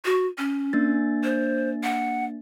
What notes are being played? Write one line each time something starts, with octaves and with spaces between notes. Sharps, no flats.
F#4
C#4
A#3 D4 A6
C5
F#5